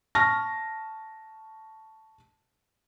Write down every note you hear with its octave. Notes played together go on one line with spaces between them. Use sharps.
A5 C#6 F6 A#6